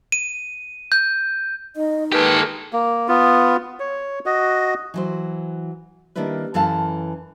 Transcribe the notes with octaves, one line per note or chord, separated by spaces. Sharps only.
D#7
G6
D#4 D#5
D#3 G#3 A#3 G4 A4 B4
A#3
B3 F4
C#5
F#4 D#5
E3 F#3 C5
D#3 G3 A#3 D4 E4 B4
F#2 E3 A4 B4 F5 A5